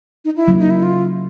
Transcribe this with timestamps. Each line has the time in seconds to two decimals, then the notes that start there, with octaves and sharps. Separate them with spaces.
0.25 D#4
0.36 E4
0.47 C#3 F#3 A#3
0.59 D#4
0.70 E4
0.83 F4